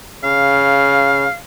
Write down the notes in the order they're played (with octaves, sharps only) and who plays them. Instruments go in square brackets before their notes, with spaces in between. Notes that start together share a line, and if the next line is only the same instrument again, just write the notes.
[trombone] C#3 [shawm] F5